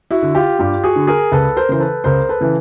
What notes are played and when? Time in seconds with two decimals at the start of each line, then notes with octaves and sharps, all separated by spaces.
0.11 E4 F#4
0.23 D3
0.35 F4 G4
0.59 G2 F4 G4
0.84 F#4 G#4
0.96 D3
1.07 G#4 A#4
1.32 C#2 A4 B4
1.57 A#4 C5
1.69 C#3 E3 C5
1.80 A4 B4
2.04 C#2 A#4 C5
2.29 A4 B4
2.41 C#3 E3